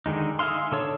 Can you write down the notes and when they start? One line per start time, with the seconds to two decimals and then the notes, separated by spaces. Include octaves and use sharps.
0.06 D3 D#3 G#3 D#4
0.39 D#4 G#4 E5 F5 C6
0.72 D3 A4 C#5